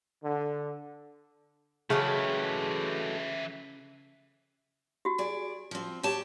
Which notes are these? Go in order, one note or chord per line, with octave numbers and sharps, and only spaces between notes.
D3
C#3 E3 F#3 G#3 A3 G4
F#4 G4
G#4 D5
F3 C4
G4 C#5 A5